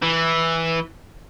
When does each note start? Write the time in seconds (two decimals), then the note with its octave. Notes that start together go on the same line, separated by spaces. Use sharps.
0.02 E3